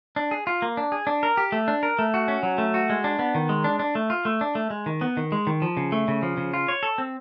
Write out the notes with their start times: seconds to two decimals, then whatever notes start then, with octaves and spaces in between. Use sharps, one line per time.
0.16 D4
0.31 G#4
0.47 F4
0.62 A#3
0.77 D4
0.92 G#4
1.07 D4
1.23 A#4
1.37 G4
1.52 A3
1.68 D4
1.83 A#4
1.99 A3
2.14 F#4
2.28 C#4
2.43 F#3
2.58 A3
2.74 F#4
2.90 G#3
3.04 D4
3.19 B3
3.35 D#3
3.49 G#3
3.64 D4
3.79 D4
3.95 A3
4.10 F4
4.25 A3
4.41 D4
4.55 A3
4.70 G#3
4.86 D#3
5.01 B3
5.17 D#3
5.32 G#3
5.47 D#3
5.62 F3
5.77 C#3
5.92 A3
6.08 C#3
6.23 F3
6.37 C#3
6.54 F4
6.68 C#5
6.83 A4
6.98 C4